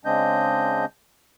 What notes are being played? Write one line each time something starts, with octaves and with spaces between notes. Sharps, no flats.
C#3 G#3 C4 D4 D#5 G6